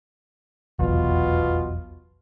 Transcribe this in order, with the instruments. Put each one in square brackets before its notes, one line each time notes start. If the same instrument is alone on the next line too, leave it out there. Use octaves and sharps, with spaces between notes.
[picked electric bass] F1 B1 E2 [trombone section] B2 B3 F4